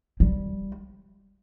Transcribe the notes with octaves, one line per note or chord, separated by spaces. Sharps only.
G3